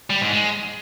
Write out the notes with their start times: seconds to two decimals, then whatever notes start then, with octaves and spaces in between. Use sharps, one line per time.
0.10 G3
0.21 G#2
0.32 G#3